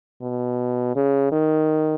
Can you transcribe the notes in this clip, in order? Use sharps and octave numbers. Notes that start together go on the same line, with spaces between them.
B2
C#3
D#3